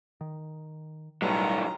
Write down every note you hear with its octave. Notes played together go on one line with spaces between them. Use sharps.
D#3
B1 A2 D#3 F#3 G3 F4 A#5